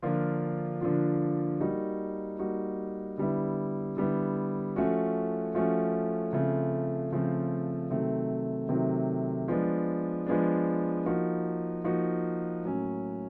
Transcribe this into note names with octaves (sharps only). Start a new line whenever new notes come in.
D3 F3 A#3 D4 F4
D3 F3 A#3 D4 F4
G3 A#3 D#4 F#4
G3 A#3 D#4 F#4
D3 G3 B3 E4
D3 G3 B3 E4
F3 A3 C#4 F#4
F3 A3 C#4 F#4
C#3 F3 A3 C4
C#3 F3 A3 C4
C3 D#3 F#3 A3 C4
C3 D#3 F#3 A3 C4
F3 G#3 B3 D4
F3 G#3 B3 D4
F3 A#3 D#4 F#4
F3 A#3 D#4 F#4
A2 F#3 A#3 C#4